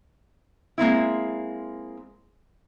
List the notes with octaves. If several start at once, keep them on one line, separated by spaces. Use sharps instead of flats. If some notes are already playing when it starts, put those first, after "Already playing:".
G#3 A#3 C4 E4